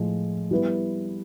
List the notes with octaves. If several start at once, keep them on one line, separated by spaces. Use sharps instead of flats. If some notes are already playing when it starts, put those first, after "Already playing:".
Already playing: A2 F3 G#3
G3 B3 E4